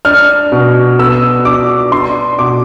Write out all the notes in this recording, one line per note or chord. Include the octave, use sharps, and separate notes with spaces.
D4 F6
B2
B3 E6
D4 D6
D4 C6
B2 D6